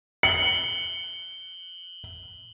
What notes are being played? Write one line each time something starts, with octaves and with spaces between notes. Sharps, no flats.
C#7 F#7 G7